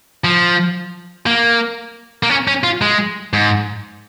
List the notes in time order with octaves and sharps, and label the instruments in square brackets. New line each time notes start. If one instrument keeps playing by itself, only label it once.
[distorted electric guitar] F3
A#3
A#3
C#4
C#4
F4
G#3
G#2